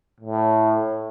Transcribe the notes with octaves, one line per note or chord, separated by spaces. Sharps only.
A2